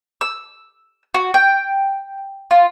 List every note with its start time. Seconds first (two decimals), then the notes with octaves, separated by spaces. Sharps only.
0.21 E6
1.14 F#4
1.34 G5
2.51 F4